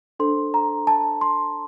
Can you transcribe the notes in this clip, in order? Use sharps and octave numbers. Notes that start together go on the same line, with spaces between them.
D4 A4 C5 C6
A#5
A5
C6